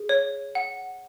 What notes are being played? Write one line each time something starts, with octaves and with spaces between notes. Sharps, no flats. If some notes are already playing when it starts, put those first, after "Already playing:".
Already playing: G#4
C#5
F#5